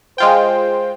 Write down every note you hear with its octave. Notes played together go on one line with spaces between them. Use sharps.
G#3 F4 C5 G5